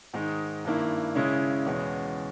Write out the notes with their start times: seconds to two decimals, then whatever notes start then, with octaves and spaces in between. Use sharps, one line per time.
0.14 G#2 D#3 G#3 D#4
0.65 G2 D#3 A#3 E4
1.15 C#3 G#3 C#4 E4
1.66 E2 B2 G#3 C#4